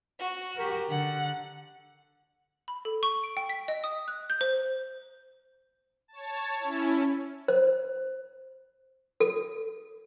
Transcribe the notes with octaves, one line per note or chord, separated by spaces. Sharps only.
F#4
G4 A#4
D3 F#5
B5
A4
C#6
D7
G5
B6
D#5
D#6
F#6
G6
C5
C#5 A5
C#4 E4
C5
A4